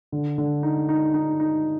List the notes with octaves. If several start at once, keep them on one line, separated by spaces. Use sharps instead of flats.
D3
D3
D#4
D#4
D#4
D#4